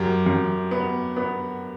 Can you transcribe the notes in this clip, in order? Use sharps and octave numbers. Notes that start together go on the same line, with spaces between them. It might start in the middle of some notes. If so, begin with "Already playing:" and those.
Already playing: F#2 G4
F#2
B3
B3